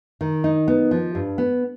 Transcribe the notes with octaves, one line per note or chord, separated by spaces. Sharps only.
D#3
D#4
B3
F3
G2
B3